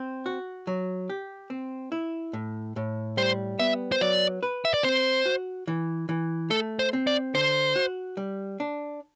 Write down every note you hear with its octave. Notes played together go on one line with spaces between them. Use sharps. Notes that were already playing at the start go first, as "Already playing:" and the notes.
Already playing: C4
F#4
F#3
G4
C4
E4
A2
A2
G3 C5
B3 E5
C5
F#3 D5
B4
E5
D5
C4 C5
F#4
E3
E3
A3 A4
C5
C4
D5
D3 C5
F#4
G3
D4